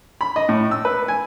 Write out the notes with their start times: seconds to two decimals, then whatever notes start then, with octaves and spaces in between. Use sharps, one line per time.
0.21 B5
0.36 D#5
0.49 A2
0.71 E6
0.85 B4
1.08 G#5